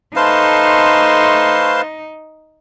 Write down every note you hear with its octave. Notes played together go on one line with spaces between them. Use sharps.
A3 D#4 B4 C5 F5 A5 C6